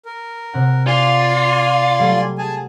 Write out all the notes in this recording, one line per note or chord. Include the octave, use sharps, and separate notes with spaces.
A#4
C3 F#5
F4 D5 G#5 C6
F#3 G3 A3
G#4 G#5 A5